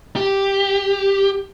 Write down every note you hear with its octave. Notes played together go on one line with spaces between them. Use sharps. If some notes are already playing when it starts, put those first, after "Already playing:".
G4